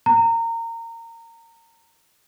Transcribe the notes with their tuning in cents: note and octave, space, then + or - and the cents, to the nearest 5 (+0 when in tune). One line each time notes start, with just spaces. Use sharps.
A#5 -25